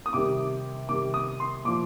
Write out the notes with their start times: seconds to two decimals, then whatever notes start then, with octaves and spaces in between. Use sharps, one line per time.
0.06 D#6
0.13 C3 D#3 G3 D6
0.89 C3 D#3 G3 D6
1.14 D#6
1.40 C6
1.64 A#2 F3 D6